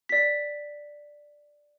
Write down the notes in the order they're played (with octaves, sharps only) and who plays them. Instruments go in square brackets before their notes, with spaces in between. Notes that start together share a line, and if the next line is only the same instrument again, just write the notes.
[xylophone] D5 B6